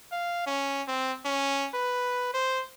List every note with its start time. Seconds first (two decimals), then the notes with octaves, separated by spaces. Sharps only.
0.12 F5
0.47 C#4
0.88 C4
1.25 C#4
1.74 B4
2.34 C5